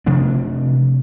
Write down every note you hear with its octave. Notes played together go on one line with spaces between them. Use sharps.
C3 F3 A3 D4